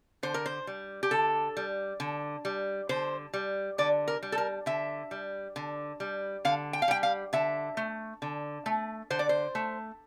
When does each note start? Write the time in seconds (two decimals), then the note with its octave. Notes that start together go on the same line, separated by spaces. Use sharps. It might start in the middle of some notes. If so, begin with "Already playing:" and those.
0.23 D3 C5
0.34 A#4
0.46 C5
0.67 G3
1.03 G4
1.11 D3 A4
1.57 G3
2.00 D3
2.45 G3
2.89 D3 C5
3.33 G3
3.78 D3 D5
4.08 A#4
4.23 G3
4.32 A4
4.38 A#4
4.66 D3 E5
5.11 G3
5.56 D3
6.00 G3
6.45 D3 F5
6.73 G5
6.82 F5
6.88 G3 G5
7.03 F5
7.33 D3 E5
7.77 A3
8.22 D3
8.66 A3
9.10 D3 C5
9.19 D5
9.29 C5
9.55 A3